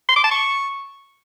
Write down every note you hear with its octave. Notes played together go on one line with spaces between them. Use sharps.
C6
D6
A5
C#6